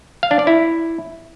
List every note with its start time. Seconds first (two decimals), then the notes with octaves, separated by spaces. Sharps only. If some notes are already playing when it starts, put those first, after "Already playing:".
0.23 F5
0.31 D4
0.39 D5
0.47 E4